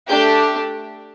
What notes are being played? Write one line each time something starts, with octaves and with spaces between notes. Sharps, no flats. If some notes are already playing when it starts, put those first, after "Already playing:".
A3 D4 G4 G6